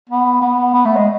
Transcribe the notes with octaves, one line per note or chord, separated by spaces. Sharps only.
B3
B3
B3
A3
G#3